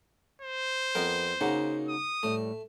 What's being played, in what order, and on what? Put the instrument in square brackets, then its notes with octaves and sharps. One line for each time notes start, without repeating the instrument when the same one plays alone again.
[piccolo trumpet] C5
[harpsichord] F2 B3 A#4
[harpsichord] C#3 A#3 [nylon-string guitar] D#4 F#4 F#5
[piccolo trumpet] D#6
[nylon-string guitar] A2 G3 [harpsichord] A3